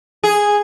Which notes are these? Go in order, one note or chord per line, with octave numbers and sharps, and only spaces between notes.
G#4